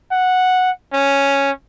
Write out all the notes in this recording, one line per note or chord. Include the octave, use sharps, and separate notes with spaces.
F#5
C#4